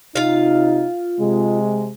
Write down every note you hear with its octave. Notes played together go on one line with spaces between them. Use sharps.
C3 D#4 F4 F5
C3 G#3